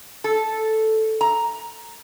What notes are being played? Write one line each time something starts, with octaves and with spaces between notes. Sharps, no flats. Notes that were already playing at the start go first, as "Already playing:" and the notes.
A4
A#5